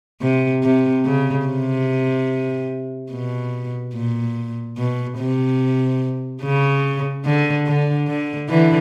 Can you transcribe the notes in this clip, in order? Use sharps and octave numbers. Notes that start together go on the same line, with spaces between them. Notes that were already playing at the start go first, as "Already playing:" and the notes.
C3
C3
C#3
C3
B2
A#2
B2
C3
C#3
D3
D3
D3
D3 E3